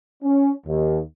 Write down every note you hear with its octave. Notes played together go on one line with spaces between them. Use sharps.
C#4
D#2